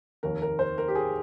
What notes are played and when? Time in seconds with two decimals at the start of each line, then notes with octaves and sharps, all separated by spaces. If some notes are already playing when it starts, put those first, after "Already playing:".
0.23 F1 D#2 D#3 A#4
0.42 A#4
0.59 C5
0.78 A#4
0.88 G4
0.95 G#4